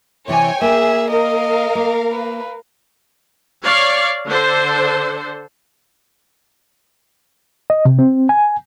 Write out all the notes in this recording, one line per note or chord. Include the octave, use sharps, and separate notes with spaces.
C3 E3 C#5 D5 G5 G#5
A#3 G#4 E5
A#4 D#5 F5
A#3
B4
C#5 D5 F5
D3 D4 A4 C5
D#5
C3
C4
G#5